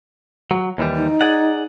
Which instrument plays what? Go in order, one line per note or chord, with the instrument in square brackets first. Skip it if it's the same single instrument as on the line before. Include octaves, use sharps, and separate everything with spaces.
[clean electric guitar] F#3
D#2 E3 G3
[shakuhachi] D#4
[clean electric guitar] G#4 D5 F#5